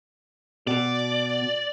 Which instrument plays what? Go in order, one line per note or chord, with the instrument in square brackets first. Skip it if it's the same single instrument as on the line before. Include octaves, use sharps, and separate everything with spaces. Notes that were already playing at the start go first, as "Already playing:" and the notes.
[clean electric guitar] B2 [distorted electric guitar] D5